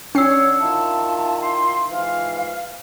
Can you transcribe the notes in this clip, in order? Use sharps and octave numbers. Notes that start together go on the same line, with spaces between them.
D3 C#4 D4 C#5 E6 C7
D#3 E4 F4 A5
C6
G#2 E3 F3 F5